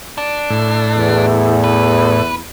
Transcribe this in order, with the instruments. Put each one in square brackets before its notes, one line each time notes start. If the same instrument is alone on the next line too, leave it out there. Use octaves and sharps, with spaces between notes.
[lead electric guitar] D4
[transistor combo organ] A2
[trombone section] E2
[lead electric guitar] B4